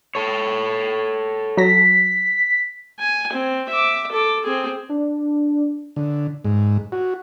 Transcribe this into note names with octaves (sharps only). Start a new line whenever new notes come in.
A4 C#5
F#3 A#6 B6
G#5
C4
E5 D6
A4 D6
C4 G#4
D4
D3
G#2
F#4